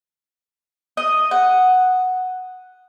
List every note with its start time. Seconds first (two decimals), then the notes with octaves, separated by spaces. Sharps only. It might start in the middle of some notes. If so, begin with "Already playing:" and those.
0.97 D#5
1.31 F#5